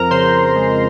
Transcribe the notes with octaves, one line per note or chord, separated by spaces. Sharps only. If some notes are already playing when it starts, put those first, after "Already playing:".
Already playing: F2 F3 A#4 A#5
C#3 C5 C6
G#3